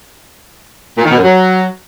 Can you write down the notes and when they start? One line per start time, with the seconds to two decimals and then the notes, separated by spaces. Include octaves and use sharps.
0.98 A#2
1.04 D#3
1.11 B2
1.17 F#2
1.23 F#3